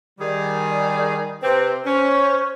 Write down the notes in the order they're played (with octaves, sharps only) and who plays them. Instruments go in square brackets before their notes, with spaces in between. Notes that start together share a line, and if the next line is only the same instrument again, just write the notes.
[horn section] D#3 G3 G#4 [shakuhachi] D5
[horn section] C3 C4 [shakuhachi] B4
[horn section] C#4 [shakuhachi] C5